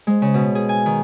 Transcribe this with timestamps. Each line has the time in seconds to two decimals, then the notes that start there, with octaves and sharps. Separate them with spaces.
0.07 G#3
0.22 C#3
0.34 B2
0.55 G#4
0.69 G#5
0.86 D#3